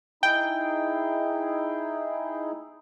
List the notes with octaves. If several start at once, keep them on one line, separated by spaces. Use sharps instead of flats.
D#4 E4 G#4 G5